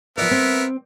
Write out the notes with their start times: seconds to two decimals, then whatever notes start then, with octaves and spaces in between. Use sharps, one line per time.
0.18 F3 B3 A#4 D5 E5
0.31 C4